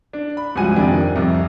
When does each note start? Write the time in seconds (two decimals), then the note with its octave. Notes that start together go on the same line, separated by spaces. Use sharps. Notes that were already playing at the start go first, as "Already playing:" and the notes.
0.13 D4
0.37 B5
0.56 C#2 G2 F3 F#4 G#5 D#7
0.76 F2 C3 D#3 D4
1.15 C2 F2